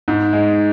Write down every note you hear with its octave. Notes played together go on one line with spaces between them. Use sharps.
G#2
G#3